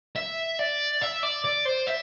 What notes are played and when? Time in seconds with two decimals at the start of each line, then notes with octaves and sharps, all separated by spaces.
0.16 E5
0.59 D5
1.01 E5
1.23 D5
1.44 D5
1.65 C5
1.87 E5